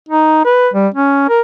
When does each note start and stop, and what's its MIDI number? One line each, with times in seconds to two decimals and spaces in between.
0.09 0.43 63
0.45 0.68 71
0.74 0.88 55
0.94 1.28 61
1.29 1.41 70